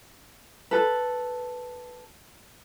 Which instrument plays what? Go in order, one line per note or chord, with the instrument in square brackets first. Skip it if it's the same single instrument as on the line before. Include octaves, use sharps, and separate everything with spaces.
[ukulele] A4 B4